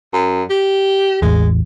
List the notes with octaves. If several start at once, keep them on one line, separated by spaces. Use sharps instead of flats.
F#2
G4
A1 E2 G#3